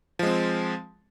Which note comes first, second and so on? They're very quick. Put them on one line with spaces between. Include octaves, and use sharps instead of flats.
F3 G#3 C4